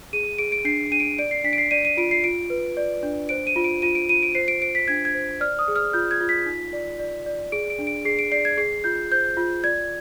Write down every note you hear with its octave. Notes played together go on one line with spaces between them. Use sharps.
G#4 D#7
G#4 D7
D7
D4 C7
D4 D#7
D7
D5 D7
C7
D4 B6
D7
C7
D5 D#7
D#7
F4 D7
C7
F4 D7
B4
D5
D4
C5 D7
D#7
F4
D7
F4 D#7
D7
F4 D#7
D7
C5 C7
D7
C5 D7
B6
D4 G#6
G#6
C5
D5 F6
D#6
G#4
F6
F4 G6
G#6
F4
B6
D#4
D5
D5
D5
G#4 D7
D7
D4
D7
G#4 C7
D7
D5 C7
G#6
G#4 C7
F4 G6
C5 G6
F4
D5 G#6